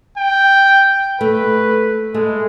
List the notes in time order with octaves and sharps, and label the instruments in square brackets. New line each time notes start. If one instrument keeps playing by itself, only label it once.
[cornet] G5
[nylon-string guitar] A3 [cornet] B4
[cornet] G#3 [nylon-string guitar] A3